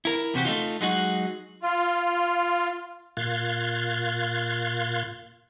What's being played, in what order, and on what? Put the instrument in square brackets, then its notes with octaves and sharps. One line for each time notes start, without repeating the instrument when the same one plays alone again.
[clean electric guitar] E4 A#4
E2 C3 F#4 G4
A3 A#3 D#4 F4
F#3 G#3 D#4 F#4
[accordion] F4
[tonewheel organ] A#2 F5 C6 F#6 G#6 A6